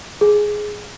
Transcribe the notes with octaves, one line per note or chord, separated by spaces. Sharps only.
G#4